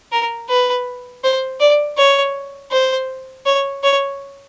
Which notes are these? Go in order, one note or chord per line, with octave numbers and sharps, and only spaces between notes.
A#4
B4
C5
D5
C#5
C5
C#5
C#5